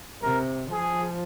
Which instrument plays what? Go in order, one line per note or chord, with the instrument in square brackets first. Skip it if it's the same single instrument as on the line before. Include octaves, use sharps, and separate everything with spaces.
[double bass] C3 [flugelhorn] A#4
[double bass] F3 [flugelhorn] G#4